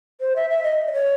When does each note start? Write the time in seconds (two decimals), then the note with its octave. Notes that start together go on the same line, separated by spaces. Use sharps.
0.21 C5
0.36 E5
0.50 E5
0.63 D#5
0.88 D5
0.93 C#5